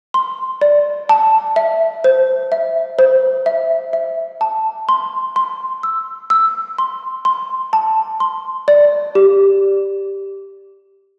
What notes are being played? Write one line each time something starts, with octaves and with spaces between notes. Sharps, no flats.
C6
D5
A5
E5
C5
E5
C5
E5
E5
A5
C6
C6
E6
E6
C6
C6
A5
C6
D5
G4